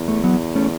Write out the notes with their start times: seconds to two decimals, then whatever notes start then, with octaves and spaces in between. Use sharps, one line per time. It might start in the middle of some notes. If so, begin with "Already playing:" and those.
Already playing: E2
0.08 A3
0.24 F#3 B3
0.55 A3 C#4